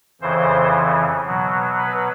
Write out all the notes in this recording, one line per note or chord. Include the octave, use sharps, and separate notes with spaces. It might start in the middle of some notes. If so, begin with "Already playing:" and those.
F2 C#3 E3 C5
B2 F#3
B4